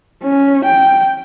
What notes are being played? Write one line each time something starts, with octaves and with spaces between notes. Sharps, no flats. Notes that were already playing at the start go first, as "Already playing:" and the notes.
C#4
G5